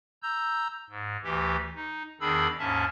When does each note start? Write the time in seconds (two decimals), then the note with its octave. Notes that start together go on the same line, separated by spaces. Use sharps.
0.23 A#5 E6 G6
0.90 G#2
1.23 D2 E3 G4
1.75 D#4
2.21 E2 D#3 D4 G#4 B5 E6
2.59 D#2 G#2 C#4 E5 A5